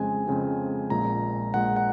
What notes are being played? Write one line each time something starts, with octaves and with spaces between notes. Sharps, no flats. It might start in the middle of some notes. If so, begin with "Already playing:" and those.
Already playing: F2 C#3 G#3 C4 G#5
F2 C#3 G#3 C4
A#1 A#2 G#3 A#5
A#1 A#2 G#3 F#5
F#5